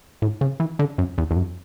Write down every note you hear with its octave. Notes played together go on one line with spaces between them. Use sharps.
A2
C#3
E3
D3
F#2
E2
E2
F#2